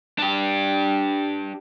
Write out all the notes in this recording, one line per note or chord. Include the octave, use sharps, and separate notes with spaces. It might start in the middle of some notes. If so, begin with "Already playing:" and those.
D4 G4